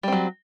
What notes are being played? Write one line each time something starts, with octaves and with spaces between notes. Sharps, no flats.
F#3 G3 C4